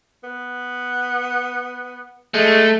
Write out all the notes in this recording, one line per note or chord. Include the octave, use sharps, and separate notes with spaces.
B3
G#3 A3